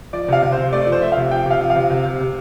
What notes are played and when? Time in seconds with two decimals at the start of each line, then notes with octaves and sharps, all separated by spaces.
0.13 F3 D5
0.28 C3 F5
0.42 C3
0.52 C5
0.58 C3
0.72 A3 D5
0.87 F3
0.92 C5
1.02 F3 E5
1.12 C3 F5
1.31 F3 G5
1.46 C3 F5
1.60 F3
1.70 F5
1.76 C3
1.90 C3
2.05 C3
2.20 C3